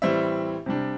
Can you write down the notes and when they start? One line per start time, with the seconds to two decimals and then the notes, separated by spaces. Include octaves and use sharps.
0.02 A2 E3 G3 C4 E4 E5
0.66 C3 G3 D4